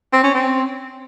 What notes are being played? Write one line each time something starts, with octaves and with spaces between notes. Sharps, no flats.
C4
C#4
C4